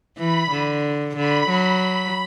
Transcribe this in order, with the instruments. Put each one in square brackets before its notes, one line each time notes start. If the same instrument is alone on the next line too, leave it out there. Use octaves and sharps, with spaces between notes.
[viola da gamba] E3 [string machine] B5
[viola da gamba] D3
[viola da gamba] D3 [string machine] B5
[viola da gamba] F#3
[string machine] B5